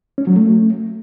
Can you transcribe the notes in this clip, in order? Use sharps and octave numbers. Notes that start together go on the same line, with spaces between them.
C#4
F#3
A3